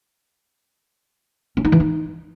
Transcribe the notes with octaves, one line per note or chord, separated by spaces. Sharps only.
C#4
D#4
E3
D#4